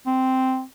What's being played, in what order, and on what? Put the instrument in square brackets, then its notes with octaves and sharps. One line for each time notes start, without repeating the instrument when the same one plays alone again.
[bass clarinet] C4